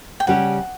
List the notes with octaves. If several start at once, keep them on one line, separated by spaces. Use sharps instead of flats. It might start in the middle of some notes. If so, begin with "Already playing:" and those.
G5
C#3 G3 C#4 G4 F#5